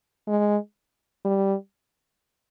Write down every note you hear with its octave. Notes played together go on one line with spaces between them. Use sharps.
G#3
G3